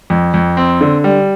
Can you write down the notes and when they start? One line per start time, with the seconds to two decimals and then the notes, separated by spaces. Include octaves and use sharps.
0.10 F2
0.34 F2
0.57 C4
0.81 D3
1.04 G3